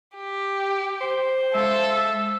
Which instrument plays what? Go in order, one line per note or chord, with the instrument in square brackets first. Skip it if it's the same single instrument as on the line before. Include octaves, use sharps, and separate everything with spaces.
[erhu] G4
[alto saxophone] C5
[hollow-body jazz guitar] G#3 F5 [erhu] A4 [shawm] E5